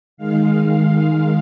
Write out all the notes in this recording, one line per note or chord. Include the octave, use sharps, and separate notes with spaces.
D#3 G#3 F5